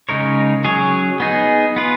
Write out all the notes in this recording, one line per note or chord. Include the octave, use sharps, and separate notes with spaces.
C#3 G#3 D#4 A#4 C#5
F#3 C#4 G#4 C#5
B3 D#4 G#4
B3 F4 B4